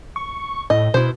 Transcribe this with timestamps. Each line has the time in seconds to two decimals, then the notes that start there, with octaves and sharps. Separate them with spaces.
0.16 C#6
0.70 A2 D#5
0.94 B2 E4 C5